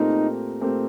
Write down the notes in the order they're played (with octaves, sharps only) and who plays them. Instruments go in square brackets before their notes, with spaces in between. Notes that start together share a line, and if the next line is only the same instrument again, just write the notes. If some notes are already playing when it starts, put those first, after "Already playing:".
Already playing: [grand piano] A#2 A3 C4 G4 A#4 [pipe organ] D#4
[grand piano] A#2 A3 C4 G4 A#4